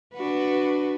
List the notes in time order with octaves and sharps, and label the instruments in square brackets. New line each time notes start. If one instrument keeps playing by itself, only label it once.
[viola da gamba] D4 F#4 B4